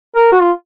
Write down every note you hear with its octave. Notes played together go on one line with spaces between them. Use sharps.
A#4
F#4
F4